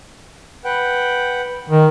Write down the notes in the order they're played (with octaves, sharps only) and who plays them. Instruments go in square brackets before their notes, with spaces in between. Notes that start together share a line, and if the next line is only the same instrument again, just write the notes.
[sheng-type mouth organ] B4 F#5 G5
[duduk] D#3